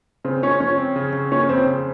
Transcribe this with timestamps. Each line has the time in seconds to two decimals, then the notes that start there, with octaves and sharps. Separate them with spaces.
0.24 C#3 C4
0.42 C#3 C#4
0.60 F3 C#4
0.78 C4
0.96 C#3
1.13 C#3
1.32 A#3 C#4
1.49 F2 C4
1.67 C#3